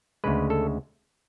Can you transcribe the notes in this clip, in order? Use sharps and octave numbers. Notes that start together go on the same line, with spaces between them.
D2 C#3 G#3 B4
A4